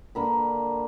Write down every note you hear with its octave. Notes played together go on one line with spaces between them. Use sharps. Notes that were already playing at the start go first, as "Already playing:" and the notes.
D3 A#3 B5